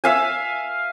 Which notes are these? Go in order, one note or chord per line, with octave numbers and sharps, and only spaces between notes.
E5 F5 G#5